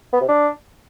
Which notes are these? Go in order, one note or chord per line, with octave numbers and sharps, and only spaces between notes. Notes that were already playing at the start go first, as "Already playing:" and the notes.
B3
C3
D4